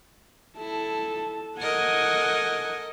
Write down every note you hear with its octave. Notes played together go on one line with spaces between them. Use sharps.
E4 A4 A5
A4 A#4 D#5 F#5 G#5